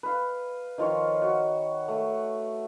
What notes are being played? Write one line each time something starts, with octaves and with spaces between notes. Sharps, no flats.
B4 F5
D#3 F3 F4 C#5
F#4
A3